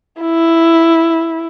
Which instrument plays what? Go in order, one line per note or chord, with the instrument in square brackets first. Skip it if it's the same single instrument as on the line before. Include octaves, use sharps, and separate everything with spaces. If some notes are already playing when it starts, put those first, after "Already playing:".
[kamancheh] E4